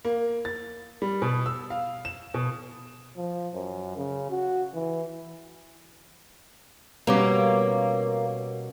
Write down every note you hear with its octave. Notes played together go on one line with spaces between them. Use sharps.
A#3
A6
G3
B2
E6
F5
E7
B2
F3
F#2
C#3
F#4
E3
B2 G3 A#3 C#4 B4 C#5 D6